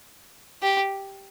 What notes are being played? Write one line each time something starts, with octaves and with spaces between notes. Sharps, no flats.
G4